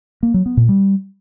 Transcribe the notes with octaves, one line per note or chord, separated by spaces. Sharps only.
A#3
F#3
B3
A#2
G3